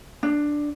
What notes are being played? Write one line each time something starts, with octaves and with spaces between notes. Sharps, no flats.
D4